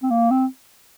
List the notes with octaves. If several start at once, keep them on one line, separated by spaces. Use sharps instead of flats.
C4
A#3
C4